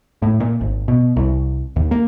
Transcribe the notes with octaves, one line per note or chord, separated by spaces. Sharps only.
A2
A#2
G#1
B2
C2
D#2
A#3